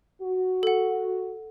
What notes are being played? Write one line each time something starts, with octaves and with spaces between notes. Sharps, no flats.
F#4
A4 F#5